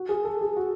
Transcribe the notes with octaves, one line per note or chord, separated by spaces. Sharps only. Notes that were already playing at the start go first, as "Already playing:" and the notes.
Already playing: F#4
G#4
A4
G#4
F#4